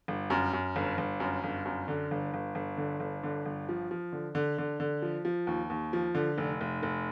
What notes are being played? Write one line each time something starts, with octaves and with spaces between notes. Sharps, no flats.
G1
F#2
F#2
G1
G1
F#2
G1
F#2
D3
G1
G1
G1
D3
G1
D3
G1
F3
F3
D3
D3
D3
D3
F3
F3
D#2
D#2
F3
D3
F1
F1
F1